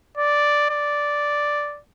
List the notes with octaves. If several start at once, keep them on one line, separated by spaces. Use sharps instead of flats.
D5
D5